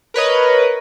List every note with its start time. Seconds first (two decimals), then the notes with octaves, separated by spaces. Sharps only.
0.14 A#4 B4 C#5 D#5